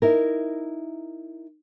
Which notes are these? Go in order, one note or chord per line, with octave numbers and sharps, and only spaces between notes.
D#4 E4 A#4